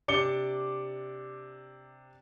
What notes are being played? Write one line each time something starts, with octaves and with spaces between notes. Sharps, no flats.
C3 D4 D6 C#7 G7